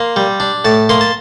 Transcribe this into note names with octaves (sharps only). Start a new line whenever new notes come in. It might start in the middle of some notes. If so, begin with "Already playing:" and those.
Already playing: A#3 C6
G3
D4
A2 A5
A#3 C6
A5